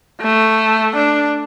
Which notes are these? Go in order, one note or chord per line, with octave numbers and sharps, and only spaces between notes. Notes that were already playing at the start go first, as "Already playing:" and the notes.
A3
D4